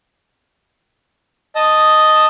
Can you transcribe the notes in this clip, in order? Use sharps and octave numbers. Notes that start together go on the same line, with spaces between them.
D#5 A5 D#6